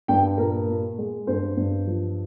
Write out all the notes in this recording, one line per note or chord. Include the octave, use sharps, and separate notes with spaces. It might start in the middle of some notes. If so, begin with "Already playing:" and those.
G2 G5
A#2 A#4
A#2
G#3
G2 C5
G2
F3